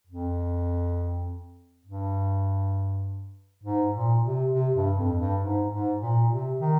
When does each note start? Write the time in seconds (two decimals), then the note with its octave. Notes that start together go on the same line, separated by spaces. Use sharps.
0.07 F2
1.85 G2
3.63 G#2
3.93 A#2
4.23 C3
4.52 C3
4.75 G2
4.97 F2
5.19 G2
5.41 G#2
5.71 G#2
6.01 A#2
6.30 C3
6.60 D#3